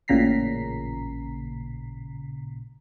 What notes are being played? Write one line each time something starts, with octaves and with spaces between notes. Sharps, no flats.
A1 A#2 C#3 A#5 B6 C7